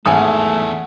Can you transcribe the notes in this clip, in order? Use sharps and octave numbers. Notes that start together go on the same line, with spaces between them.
G#1 E2 A3 A4 F#5 G#5 D#6